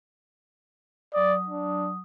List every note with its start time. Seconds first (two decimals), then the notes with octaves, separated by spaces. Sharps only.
1.14 F#3 D5 D#6
1.48 D4